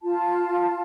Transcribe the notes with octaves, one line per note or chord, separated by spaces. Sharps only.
F4 A5